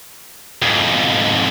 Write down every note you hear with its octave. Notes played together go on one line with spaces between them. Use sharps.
F2 G#2